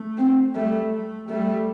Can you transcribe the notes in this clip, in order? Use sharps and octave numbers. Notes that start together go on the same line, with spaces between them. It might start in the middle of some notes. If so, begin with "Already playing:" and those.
Already playing: A3
C4
G3 A3
A3
G3 A3